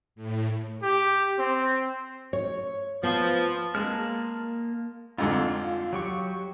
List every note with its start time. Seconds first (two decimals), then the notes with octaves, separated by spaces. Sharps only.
0.15 A2
0.83 G4
1.39 C4
2.33 C#5
3.03 F3 B3
3.75 G#3 A#3 A5 F6
5.18 F2 G#2 D3 F4
5.93 F#3 G4 C#6